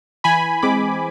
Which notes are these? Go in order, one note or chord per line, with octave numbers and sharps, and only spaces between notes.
E3 G#5 B5
G#3 C4 B5 D6